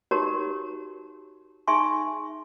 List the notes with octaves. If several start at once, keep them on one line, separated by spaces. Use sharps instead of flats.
D#4 F#4 G4 A#4 C#5 A#5
D#4 G#4 E5 G#5 C6 C#6